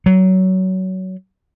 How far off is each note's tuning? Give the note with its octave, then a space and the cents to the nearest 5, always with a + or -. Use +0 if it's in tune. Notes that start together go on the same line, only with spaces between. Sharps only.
F#3 +20